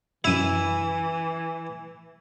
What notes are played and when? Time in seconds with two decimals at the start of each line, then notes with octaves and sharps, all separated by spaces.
0.24 F#2 E3 E4 D#7 E7